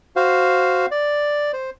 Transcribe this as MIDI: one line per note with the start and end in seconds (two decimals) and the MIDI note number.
0.16 0.86 66
0.16 0.86 72
0.16 0.86 77
0.91 1.52 74
1.53 1.70 72